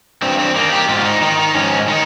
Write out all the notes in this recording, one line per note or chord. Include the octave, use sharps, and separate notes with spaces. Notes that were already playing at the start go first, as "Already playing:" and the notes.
G2 C4
C4
D#3 A#3
G4
G#2 F4
D#4
D#3 D#4
D#4
G#2 C#4
D#3 D#4